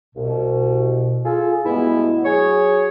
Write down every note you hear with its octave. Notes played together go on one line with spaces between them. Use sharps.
C2 B2
F4 G#4 A4
G2 B2 G#3 A3 B3 E4
F#3 G#4 C#5